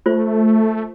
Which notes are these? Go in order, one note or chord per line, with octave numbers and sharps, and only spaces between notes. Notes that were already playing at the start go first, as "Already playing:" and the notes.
A3 F4 C5